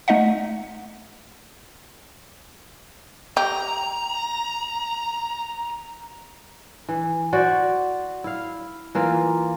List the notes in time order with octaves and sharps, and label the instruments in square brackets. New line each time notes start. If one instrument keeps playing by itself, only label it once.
[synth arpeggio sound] A3 D#4 D#5 E5 F#5
[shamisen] G4 [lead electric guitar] A#5
[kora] E3
F#4 C5 D5 F#5
E4 F5
E3 A#3 F4